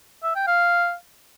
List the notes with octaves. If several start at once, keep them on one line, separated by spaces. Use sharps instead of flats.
E5
G5
F5